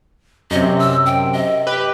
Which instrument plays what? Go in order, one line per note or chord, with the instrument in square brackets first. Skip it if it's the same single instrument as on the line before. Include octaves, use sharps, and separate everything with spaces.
[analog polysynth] F#2 C3 [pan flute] D#5
[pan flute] E6
G5
D#5
[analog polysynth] G4 B4